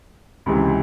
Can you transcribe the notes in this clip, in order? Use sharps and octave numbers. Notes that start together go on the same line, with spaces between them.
C#2 C3 E3